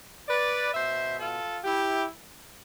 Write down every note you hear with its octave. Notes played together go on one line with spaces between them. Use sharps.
B4 D5
B2 C5 E5
F4 A4
E4 G4